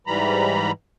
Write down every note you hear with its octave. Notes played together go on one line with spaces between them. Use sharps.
G#2 E3 G3 A#5 B5